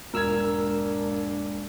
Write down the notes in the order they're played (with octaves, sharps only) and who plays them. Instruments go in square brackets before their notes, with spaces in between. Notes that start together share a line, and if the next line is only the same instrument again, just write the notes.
[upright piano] E1 G#6 [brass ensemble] G#2 A#3 D4 [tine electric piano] A#4 E6 F6